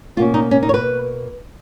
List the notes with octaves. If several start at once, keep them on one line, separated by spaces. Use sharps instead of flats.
B2 A#3 C#4 F4
D#4
C#4
D#4
C#5
B4